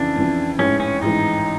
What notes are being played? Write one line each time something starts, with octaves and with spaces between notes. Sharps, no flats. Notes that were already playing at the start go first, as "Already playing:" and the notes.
Already playing: F2 C#3 E3 D4
F2 C#3 E3
A1 G#2 E3 C#4
C#4
A1 G#2 E3 D#4